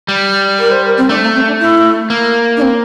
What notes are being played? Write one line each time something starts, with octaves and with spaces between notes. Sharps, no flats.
G3
A#4
C5
A#4
C4
A3 D4
A#3
C4
D4
E4
A#3
D4
C4